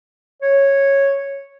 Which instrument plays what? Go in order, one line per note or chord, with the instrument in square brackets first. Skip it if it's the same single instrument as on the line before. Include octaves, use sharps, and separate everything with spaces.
[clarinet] C#5